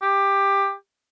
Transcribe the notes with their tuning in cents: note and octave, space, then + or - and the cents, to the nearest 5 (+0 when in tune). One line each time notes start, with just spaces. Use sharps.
G4 +15